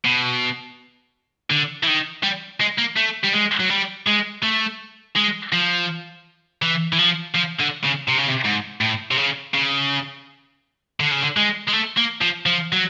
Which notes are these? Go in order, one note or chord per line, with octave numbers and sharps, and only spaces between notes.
B2
D3
E3
D#3
G3
G#3
A#3
A3
G3
G#3
F#3
G3
G#3
A3
G#3
F3
E3
E3
F3
F3
D3
C#3
C3
C#3
C3
G#2
A2
C3
C#3
C#3
D3
C#3
D3
G#3
G#3
A3
A#3
F3
F3
F#3